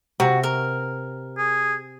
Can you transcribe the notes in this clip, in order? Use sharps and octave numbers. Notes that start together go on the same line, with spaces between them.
C3 F#4
A#4
G#4